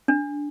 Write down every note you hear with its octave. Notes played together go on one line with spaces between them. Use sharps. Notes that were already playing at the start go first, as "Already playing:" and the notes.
D4